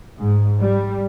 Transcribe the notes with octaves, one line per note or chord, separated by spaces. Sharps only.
G#2
G3